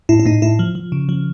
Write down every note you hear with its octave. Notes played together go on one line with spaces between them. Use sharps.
A2 E4
E4
A2 D#4
A2 E4
F3
F3
C#3
F3